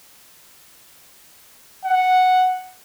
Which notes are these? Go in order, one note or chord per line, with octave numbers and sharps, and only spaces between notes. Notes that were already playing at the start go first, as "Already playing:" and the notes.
F#5